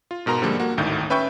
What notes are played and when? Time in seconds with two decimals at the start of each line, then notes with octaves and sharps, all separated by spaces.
0.11 F4
0.26 G#2 B2 A#4 A#5 C6
0.42 G2 D3 F3 G3 G#3 A#3
0.60 A#3 F#4
0.78 G#1 D2 A2 D#3 G6
1.10 C#4 B4 E5 G5 C#6 G6